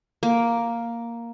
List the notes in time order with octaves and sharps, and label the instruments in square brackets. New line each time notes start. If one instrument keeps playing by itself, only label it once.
[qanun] A#3